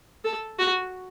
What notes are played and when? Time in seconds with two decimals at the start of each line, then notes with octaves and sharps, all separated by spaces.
0.25 A4
0.59 F#4